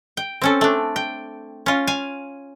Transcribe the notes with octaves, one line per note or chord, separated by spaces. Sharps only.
G5
C4 C#4 A4
A3 D4
G5
C#4 F4
F5 G#5